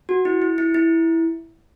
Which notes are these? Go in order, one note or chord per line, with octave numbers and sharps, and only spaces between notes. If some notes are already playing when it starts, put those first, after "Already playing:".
F#4
E4
E4
E4
E4